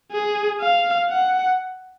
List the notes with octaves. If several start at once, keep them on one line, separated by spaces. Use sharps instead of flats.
G#4
F5
F#5